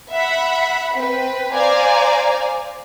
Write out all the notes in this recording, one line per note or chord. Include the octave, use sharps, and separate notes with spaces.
E5 F#5 B5
C4 B4
C5 D5 F5 G#5 A#5